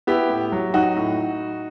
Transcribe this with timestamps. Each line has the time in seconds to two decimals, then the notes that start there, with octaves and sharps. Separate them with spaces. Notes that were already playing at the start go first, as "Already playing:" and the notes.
0.07 B3 E4 G4
0.29 A2
0.52 F#3
0.74 F#3 D#4 F#4
0.97 A2